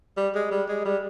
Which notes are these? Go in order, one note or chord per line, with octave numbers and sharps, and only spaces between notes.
G3
G#3
G3
G#3
G3